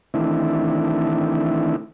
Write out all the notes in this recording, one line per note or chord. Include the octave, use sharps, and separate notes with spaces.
D#3 E3 A3 C4 D4 E4